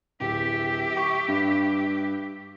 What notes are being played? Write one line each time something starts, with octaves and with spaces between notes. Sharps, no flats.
D1 G4 E5
C#6
G2